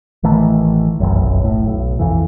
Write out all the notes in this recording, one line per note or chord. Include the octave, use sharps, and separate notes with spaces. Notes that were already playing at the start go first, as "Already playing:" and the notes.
A1 D#3 E3 A3
F1 B1 F#2
A2
B1
F2 E3